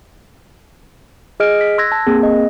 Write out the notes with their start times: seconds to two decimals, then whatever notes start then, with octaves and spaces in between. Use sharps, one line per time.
1.40 G#4 D#5 F6 D7
1.61 B6
1.78 C6 E6 F#6 G#6 A#6
1.92 A5
2.07 A#3 C4 G#4
2.23 D#5